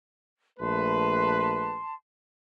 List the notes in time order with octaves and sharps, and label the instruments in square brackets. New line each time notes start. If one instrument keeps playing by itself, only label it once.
[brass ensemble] A#1 A3 B4 [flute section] A5 C6